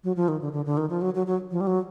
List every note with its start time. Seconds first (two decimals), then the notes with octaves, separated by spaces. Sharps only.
0.04 F#3
0.16 F3
0.28 D#3
0.41 D3
0.53 D3
0.66 D3
0.77 D#3
0.90 F3
1.02 F#3
1.15 F#3
1.27 F#3
1.52 F3
1.61 G3
1.67 F#3